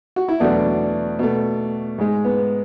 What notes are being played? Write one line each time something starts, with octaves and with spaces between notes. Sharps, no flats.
F#4
E4
E2 B2 F#3 A3 D4
B2 A3
G#2 G#3
B3